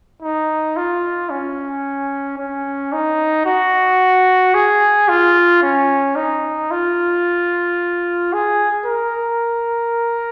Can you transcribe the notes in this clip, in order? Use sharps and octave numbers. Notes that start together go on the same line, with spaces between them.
D#4
F4
C#4
C#4
D#4
F#4
G#4
F4
C#4
D#4
F4
G#4
A#4